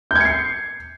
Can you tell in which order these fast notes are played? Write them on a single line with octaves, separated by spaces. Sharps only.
G6 G#6 C#7 C7